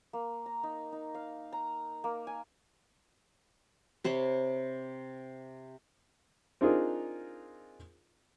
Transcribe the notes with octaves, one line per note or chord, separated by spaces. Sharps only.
A#3
A#5
D#4
D#4
F5
A#5
A#3
G#5
C3 C5 C#5 B5
C4 D4 D#4 F4 G#4 A#4